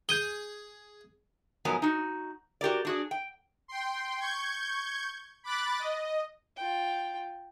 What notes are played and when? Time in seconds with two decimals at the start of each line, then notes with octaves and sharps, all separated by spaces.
0.09 G#4 G6 D#7 G7
1.65 G#2 F3 F#3 B3 A#4 G#5
1.82 D#4 F#4
2.61 F#4 G4 A#4 D5
2.85 D4 F#4 G#4
3.11 G5
3.68 G5 C6
4.19 C#6 G6 G#6
5.44 B5 D6 F#6 A6
5.79 D#5
6.56 F4 G5